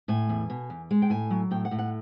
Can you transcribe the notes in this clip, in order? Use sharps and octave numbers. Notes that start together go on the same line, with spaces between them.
A2 G#5
E2
B2
E2
G#3
G5
A2 G#5
F#3
A2 G5
F#5
A2
F#5